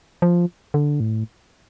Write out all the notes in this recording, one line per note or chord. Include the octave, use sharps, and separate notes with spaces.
F3
D3
A2